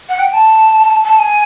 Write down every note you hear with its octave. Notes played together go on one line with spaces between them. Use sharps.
F#5
G5
A5
A5
G#5